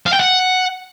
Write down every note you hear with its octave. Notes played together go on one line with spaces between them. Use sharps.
F5
G5
F#5